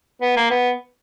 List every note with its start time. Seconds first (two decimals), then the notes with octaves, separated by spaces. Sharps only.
0.22 B3
0.36 A#3
0.51 B3